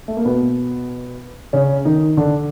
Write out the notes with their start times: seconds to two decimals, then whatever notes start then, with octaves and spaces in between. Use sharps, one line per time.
0.08 A3
0.17 A#3
0.25 B2 B3
1.53 C#3 C#4
1.85 D#3 D#4
2.17 D3 D4